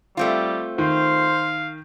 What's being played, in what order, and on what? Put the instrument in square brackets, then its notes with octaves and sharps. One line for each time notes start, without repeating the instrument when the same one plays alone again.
[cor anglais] G3 [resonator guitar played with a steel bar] A3 C4 F4
[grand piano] D#3 [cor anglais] C5 [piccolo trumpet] F5